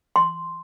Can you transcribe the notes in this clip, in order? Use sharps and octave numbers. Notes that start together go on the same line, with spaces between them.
C6